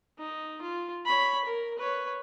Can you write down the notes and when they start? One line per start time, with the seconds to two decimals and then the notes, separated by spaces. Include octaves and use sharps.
0.18 D#4
0.62 F4
1.05 C#5 B5
1.45 A#4
1.78 B4 C#5